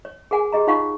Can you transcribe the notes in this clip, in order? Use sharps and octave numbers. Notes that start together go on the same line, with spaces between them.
C#5
G#4 A#4 F#5 G#5
G4 G#4 D#5 A#5
D#4 F4 C#5 F5 F#5 C#6